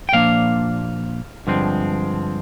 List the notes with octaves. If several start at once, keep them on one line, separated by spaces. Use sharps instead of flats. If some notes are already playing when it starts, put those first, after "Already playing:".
G5
A#2 F3 A#3 D4 F5
G2 D3 F3 G#3 C4